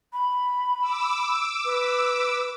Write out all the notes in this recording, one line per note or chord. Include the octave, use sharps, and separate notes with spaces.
B5
D6 E6
B4